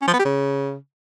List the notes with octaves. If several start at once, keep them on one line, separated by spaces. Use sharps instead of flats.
C#4
F3
B3
G4
C#3